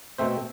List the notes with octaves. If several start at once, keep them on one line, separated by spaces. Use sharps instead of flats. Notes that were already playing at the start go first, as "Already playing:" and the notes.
B2 A3 C4 C5 E5